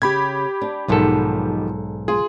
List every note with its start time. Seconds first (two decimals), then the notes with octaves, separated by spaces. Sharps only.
0.02 C#3 G4 B5 G#6
0.62 D4
0.88 B1 G#2 D#3 F3 B3 A4
2.08 F4 G#4